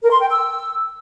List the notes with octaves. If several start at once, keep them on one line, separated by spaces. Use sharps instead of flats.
A#4
C6
G5
E6